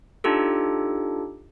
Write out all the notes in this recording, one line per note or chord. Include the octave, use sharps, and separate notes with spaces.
D4 D#4 F4 G4 A4